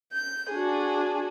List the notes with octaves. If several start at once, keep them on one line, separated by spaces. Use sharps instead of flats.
G6
D4 F#4 G#4